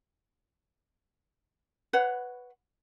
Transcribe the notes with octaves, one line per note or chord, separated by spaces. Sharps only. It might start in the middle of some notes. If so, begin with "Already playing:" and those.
B4 C#5 F#5